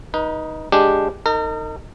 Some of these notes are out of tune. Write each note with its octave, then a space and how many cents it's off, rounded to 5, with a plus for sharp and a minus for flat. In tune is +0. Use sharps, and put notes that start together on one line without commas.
D#4 +5 B4 -35
G#3 +0 D4 +0 G4 +0
D#4 +0 A#4 -40